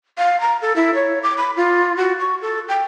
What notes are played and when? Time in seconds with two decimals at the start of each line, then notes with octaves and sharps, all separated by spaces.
0.18 F5
0.41 A#5
0.62 A4
0.76 E4
0.95 C#5
1.23 D6
1.38 B5
1.56 F4
1.97 F#4
2.20 C#6
2.42 A4
2.69 G5